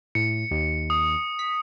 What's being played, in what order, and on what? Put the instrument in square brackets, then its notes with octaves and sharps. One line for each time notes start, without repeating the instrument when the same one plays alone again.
[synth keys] A2 [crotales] C#7
[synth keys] D#2
[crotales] D#6
[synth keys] B6